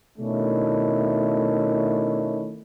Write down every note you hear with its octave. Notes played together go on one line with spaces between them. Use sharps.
B2 D#3 A3 C#4 D4 E4